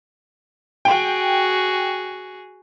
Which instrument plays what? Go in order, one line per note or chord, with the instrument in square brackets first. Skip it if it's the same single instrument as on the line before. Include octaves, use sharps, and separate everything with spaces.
[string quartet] F#4 G#4 [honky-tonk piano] G5